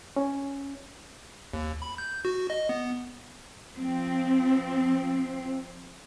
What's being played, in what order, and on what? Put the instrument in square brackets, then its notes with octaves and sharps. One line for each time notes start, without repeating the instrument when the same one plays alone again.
[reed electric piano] C#4
[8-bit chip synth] D#2
B5
G6
F#4
D#5
B3
[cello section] F3 C4